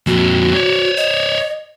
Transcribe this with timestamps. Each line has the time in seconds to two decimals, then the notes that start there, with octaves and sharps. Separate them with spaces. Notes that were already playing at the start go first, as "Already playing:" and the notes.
0.07 F2 A#2 F#4
0.54 C#5 D5
0.97 D#5